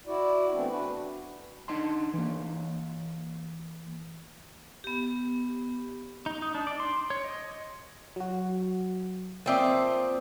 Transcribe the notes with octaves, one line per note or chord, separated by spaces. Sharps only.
E4 F#4 D5
E3 A3 B3 C4 D4
D4 F#4 B4
D4 D#4 D#5 A5 C6
E3 A#3
B3 G4
D#4
D#4
D4
D5
C6
C#5
D#5
F#3 F#4
F3 A#3 C4 D5 E5 D#6